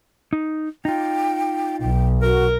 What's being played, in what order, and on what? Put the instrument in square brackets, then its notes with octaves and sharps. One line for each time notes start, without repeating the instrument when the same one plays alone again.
[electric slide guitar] D#4
[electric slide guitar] D#4 F4 [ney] G5
[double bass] B1 [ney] G5
[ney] F#4 [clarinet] A#4